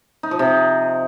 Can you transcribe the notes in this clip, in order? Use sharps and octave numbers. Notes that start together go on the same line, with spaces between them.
D#4
F3
C3